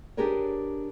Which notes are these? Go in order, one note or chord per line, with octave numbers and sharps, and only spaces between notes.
D4 G4 G#4 A#4 B4 C#5